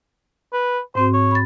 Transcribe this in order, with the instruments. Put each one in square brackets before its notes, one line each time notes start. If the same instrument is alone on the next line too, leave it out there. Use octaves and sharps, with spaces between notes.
[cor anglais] B4
[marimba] G#2 C4 F#4 [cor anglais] C5
[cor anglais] C#5
[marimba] B5 A6